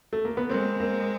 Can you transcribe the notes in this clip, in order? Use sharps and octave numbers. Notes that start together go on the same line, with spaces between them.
A3
A#3
B3
G#3 A#3 C4
A#3 C4